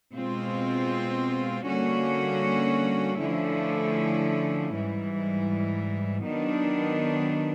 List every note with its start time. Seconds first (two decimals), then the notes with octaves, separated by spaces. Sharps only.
0.14 B2 G#3 C4 F4
1.67 D3 G3 A#3 C#4 F#4
3.19 D3 F3 A3 C#4 E4
4.72 G#2 E3 G3
6.25 D#3 F#3 B3 D4